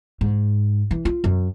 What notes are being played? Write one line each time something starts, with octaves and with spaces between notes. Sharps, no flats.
G#2
E3
F4
F#2